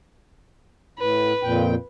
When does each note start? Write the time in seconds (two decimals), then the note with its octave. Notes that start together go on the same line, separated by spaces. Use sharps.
0.99 A2 B4
1.43 F2 A#2 G5